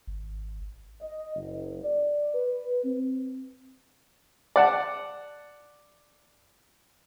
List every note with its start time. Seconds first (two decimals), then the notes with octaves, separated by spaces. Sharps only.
0.07 G#1
1.01 D#5
1.36 F#1
1.84 D5
2.34 B4
2.84 C4
4.56 D5 F#5 A5